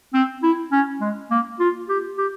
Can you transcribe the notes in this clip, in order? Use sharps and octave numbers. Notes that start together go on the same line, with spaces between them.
C4
E4
C#4
G#3
A#3
F4
G4
G4